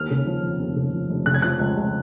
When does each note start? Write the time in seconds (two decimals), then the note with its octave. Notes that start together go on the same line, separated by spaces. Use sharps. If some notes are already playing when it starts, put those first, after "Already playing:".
Already playing: D#2 F6
0.10 C#3
0.26 F3
0.43 F1
0.60 D#2
0.76 C#3
0.94 F3
1.09 F1
1.26 C#3 F#6
1.34 G#6
1.42 F3 F#6
1.59 C#2
1.76 C#2